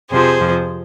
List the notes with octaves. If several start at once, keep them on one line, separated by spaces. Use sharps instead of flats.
F2 C3 F3 G#4 C5
F2 C3 F3